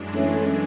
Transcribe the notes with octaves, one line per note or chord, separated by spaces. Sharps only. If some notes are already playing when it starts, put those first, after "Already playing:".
Already playing: F#2 E3 G#3 D4
A3 C#4